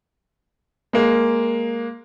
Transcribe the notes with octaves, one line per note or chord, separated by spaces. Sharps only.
G#3 A#3